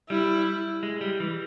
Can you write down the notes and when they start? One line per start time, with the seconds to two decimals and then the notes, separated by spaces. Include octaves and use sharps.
0.10 G3 E4
0.83 G#3
1.01 G3
1.20 E3